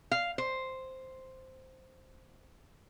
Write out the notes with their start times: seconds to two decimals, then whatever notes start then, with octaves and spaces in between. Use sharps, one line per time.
0.11 F5
0.38 C5